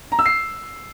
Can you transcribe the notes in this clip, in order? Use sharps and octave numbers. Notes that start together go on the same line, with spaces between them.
A#5
E6
C7